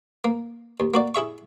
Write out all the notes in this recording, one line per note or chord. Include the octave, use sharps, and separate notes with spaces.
A#3
D#2
A#3 F#4 D5
E4 G#4 E5 C#6